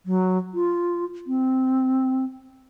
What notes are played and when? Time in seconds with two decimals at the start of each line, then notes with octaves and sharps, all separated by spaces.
0.06 F#3
0.54 F4
1.27 C4